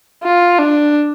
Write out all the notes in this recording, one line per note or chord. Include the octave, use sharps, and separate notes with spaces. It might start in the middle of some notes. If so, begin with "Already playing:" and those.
F4
D4